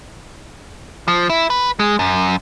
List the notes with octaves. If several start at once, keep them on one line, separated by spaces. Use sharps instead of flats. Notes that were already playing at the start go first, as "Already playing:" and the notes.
F3
E4
B4
G#3
F#2